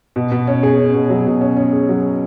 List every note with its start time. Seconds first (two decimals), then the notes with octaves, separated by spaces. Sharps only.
0.16 B2
0.32 B2
0.47 C#4
0.63 G#4
0.78 C#4
0.94 B2
1.10 F#3
1.26 B2
1.41 C#4
1.57 C#4
1.73 G#4
1.89 F#3